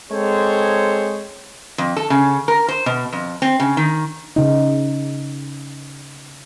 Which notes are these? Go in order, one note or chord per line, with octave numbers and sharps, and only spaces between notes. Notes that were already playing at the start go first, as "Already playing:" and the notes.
G#3 C4 A4 C5 C#5
F2
A4
C#3
A#4
C5
B2
F2
C4
C#3
D#3
C#3 D#4